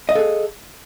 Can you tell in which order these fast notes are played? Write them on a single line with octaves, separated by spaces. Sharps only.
D#5 F5 A4 G#4